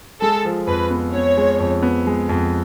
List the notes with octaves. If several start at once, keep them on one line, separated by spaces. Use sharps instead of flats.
G#3 A4
F3
F2 B4
B3
B3 C#5
G#3
F2
B3
G#3
F2